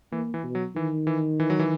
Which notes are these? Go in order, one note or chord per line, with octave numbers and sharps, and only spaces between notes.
E3 A#3
E3
B2
F#3
D#3 E3
E3
E3
F#3
E3